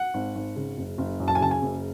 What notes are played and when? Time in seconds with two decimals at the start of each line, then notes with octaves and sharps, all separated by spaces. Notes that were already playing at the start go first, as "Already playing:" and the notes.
Already playing: F#5
0.14 G#1
0.36 G#1
0.56 C#3
0.78 F#1
0.98 F#1
1.20 F#2
1.28 A5
1.35 G#5
1.41 C#3 A5
1.51 G#5
1.62 F#1